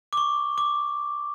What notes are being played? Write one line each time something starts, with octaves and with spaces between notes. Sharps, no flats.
D6
C#6
D6